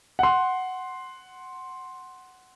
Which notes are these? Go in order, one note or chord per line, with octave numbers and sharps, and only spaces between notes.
F#5 C6